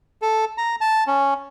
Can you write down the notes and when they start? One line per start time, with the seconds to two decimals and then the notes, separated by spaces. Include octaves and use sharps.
0.22 A4
0.58 A#5
0.81 A5
1.07 C#4